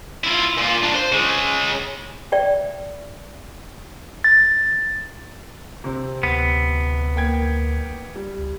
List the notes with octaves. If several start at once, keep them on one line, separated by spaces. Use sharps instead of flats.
E4 F4
A#2 F4
D4 F4
C5
C#3 G#3
D5 E5 G5
A6
C3 C4
D2 B3
A#3 G5 G#6
G3
C#2